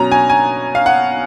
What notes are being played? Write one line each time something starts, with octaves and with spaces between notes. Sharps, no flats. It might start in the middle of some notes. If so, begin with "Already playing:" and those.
Already playing: B2 F#3 C#4 A#5
G#5
G#5
F5
F#5